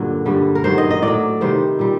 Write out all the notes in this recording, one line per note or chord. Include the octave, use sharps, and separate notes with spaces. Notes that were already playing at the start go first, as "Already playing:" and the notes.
Already playing: G2 A#2 D3 F#3
G2 D3 G3
A#4
G2 D#3 F#3 C5
D#5
D#5
A2 D5
F#3
C3 D#3 G3 C5
A#2 G3